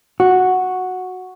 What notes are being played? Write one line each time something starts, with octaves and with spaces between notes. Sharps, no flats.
F#4